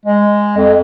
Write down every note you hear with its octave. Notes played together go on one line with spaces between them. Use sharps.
G#3
F2